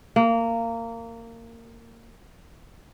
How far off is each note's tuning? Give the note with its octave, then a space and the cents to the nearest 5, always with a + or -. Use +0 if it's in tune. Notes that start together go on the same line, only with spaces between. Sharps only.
A#3 -20